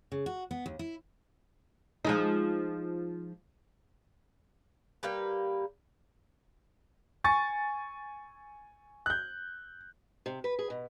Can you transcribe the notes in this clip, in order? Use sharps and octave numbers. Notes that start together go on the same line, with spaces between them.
C#3
F#4
B3
D#2
E4
F3 G#3 D#4
G3 A#3 G4 B4
G#5 C#6 A6
F#6 G6
C3
B4
G#4
B2